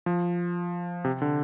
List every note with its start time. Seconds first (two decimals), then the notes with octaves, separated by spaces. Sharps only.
0.06 F3
1.05 C3
1.22 D3